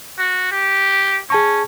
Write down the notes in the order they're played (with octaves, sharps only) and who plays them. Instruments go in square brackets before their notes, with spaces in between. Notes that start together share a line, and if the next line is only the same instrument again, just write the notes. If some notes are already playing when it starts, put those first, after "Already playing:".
[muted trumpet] F#4
G4
[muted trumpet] C#4 [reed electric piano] G#4 A5 C#6